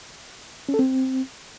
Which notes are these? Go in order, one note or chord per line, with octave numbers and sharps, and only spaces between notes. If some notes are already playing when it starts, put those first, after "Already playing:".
C#4
A4
C4